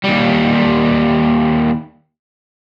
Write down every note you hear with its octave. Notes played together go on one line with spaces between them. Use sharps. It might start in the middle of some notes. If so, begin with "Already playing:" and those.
D#2 G3